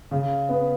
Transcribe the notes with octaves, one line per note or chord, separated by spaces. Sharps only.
C#3
B3